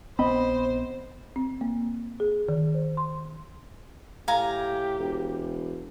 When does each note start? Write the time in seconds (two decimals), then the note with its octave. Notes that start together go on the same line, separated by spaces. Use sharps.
0.19 A#1 B3 C4 C5 D#5 B5
1.36 C4
1.61 A#3
2.20 G#4
2.49 D#3
2.74 C5
2.97 C6
4.28 A2 G4 F5 G#5 A#5
4.99 E1